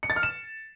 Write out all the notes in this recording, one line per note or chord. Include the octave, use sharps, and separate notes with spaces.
C#7
A6
F6
E7